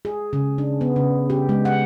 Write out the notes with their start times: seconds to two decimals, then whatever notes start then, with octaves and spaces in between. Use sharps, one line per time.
0.05 G#4
0.33 C#3
0.58 D4
0.81 B3
0.96 C#3
1.30 G4
1.49 G#3
1.65 F#5